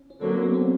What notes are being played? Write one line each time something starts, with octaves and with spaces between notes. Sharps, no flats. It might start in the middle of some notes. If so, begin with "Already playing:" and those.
Already playing: C#4
C#4
D3 F#3 A#3 C4
C4
B3
C4